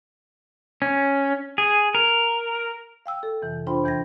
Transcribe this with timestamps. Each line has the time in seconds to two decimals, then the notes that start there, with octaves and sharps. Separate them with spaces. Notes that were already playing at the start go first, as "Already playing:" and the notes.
0.82 C#4
1.58 G#4
1.95 A#4
3.06 F5 G5 E6
3.23 A4
3.42 F2 C3 E3
3.67 D4 F4 C5 G5 B5 C6
3.84 E2 E3 G5 G#6 A#6